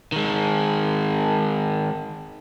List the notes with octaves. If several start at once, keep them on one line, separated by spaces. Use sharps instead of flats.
D#3 G#3